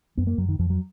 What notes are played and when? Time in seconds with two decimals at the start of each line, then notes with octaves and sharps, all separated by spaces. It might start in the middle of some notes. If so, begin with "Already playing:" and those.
0.17 F#2 B3
0.27 A#3
0.38 F#2 F#3
0.49 D#3
0.59 F2 F3
0.70 F#3